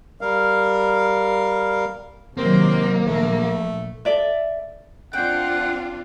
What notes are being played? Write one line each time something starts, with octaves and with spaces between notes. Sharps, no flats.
G3 A#4 F5
C3 D#3 F#3 A#3 C4
A#1 A3
A4 D5 E5
C4 D4 F4 F#5 G5